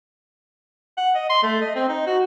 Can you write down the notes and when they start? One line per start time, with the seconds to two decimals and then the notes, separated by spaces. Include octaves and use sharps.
0.98 F#5
1.15 D#5
1.30 C6
1.43 A3
1.61 D#5
1.75 C4
1.89 D#4
2.07 F#4